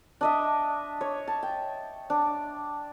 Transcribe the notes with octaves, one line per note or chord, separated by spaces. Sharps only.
D4 D#5 E5
C#5
A5
G5
D4